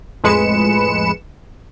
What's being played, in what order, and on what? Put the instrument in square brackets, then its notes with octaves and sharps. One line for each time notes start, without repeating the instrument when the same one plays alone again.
[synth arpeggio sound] F2 A2 G#3 B4 C#7 E7